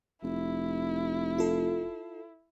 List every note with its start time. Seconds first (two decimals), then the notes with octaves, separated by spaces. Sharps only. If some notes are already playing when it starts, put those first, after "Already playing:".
0.23 F1 E4
1.38 F4 A4